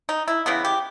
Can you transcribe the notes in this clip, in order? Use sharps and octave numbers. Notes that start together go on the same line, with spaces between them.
D#4
E4
C#3 E3 G#3 B3
G4